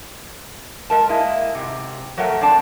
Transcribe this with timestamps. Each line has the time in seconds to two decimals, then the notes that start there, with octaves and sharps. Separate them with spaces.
0.90 G#3 A#4 A5
1.09 G#3 A#3 E4
1.55 G#2 C3
2.17 F#3 A3 A#4 F#5
2.41 C4 D4 D5 A5